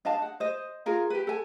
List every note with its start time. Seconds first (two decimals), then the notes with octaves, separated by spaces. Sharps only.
0.05 D4 D#5 F5 A5
0.22 F#5
0.40 C5 D#5
0.86 F4 G#4 A#4 F5
1.10 G4 B4
1.27 A4 G#5